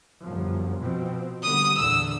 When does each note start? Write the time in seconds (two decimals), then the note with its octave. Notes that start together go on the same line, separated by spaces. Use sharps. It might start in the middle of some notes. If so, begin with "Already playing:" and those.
0.24 G1 F#2 F3
0.81 B2 F3 C4
1.43 D3 G3 B3 D#6
1.77 E2 A#2 D3 E6